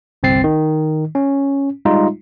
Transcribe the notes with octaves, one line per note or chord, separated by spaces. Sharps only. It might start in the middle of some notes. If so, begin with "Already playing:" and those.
G1 C2 C4 A6 C7
D#3
C#4
G3 G#3 D#4 F4